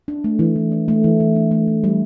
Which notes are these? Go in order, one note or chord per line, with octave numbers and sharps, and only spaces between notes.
D4
A3
E3
E3
D4
A3
E3
E3
D4
A3
E3
G3